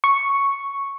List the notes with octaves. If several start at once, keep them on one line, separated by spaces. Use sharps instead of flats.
C#6